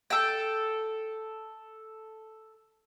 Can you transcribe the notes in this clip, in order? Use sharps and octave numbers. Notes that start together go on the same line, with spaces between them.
A4 G5